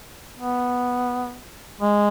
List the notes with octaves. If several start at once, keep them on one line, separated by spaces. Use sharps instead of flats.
B3
G#3